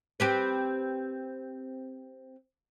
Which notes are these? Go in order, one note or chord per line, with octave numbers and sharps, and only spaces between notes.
C4 G4 B4